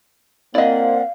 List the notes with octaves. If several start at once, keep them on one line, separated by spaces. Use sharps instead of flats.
A#3 C4 E4 D5 D#5 F5 F#5